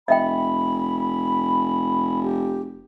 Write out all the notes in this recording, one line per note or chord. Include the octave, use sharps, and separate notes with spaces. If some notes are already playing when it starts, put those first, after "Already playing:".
F1 D#5 E5 G5 B5
G4